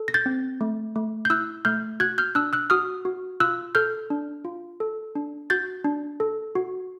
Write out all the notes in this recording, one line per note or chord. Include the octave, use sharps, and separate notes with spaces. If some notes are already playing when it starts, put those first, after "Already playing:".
Already playing: A4
A#6
G6 A6
C4
A3
A3
G6
E4 E6 F#6
A3 F6 G6
F#4 F#6 G#6
F6 G6
D4 E6 F#6
E6 F#6
F#4 D#6 F6
F#4
F4 E6 F#6
A4 F6 G6
D4
F4
A4
D4
F#4 G6 A6
D4
A4
F#4